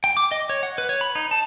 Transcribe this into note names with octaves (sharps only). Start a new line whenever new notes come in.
G5
D6
D#5
C#5
F#5
B4
C#5
B5
D#4
A5